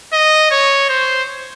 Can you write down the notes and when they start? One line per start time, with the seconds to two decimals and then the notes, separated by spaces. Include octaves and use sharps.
0.13 D#5
0.51 C#5
0.89 C5